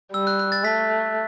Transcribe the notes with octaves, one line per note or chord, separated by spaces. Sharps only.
G3 E6
F#6
F#6
A6
A3 B6